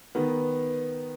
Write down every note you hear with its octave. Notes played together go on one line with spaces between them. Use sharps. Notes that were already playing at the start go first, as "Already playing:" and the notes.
D#3 B3